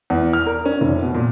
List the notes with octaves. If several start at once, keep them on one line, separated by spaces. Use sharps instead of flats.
E2
F6
A#4
C#4
F1
B2
A#2